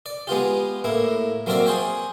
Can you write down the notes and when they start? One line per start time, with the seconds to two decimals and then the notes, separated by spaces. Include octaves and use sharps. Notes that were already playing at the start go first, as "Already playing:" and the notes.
0.06 D5
0.27 G#3 B3 F4 G4
0.84 A2 A#3 E4
1.46 F#3 A#3 C4 A#4 D5 E5
1.66 G#4 C5 C#5 G5